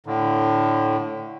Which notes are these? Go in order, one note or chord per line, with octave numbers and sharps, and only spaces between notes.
A2 D3